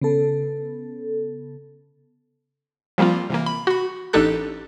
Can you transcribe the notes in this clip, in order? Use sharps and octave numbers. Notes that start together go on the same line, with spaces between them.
C#3 B3 A4
F3 G3 A#3 C4 F4
C3 E3 A#3
B5
F#4 B5
A1 D4 D#4 G4 A4 F#6